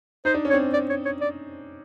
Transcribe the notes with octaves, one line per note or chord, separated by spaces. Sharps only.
D#4 C5
D4
C#4
C#5
C4 D4
D5
C#5
C#5
D5